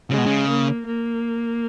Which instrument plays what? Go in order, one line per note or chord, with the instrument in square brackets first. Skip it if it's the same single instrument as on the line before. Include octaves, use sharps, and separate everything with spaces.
[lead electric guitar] C#3 [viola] G#3
[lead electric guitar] B2
C#3
[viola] A#3
A#3